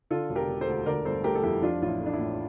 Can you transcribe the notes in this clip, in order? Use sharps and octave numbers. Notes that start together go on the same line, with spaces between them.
D3 F4 A4
E1
G4 A#4
E1
A4 C5
D2
D3 A#4 D5
G1 A4 C5
A3 G4 A#4
A4
F2 E4 G4
F3 D4 F4
A1 F4
E4
A3
D4
E4
A2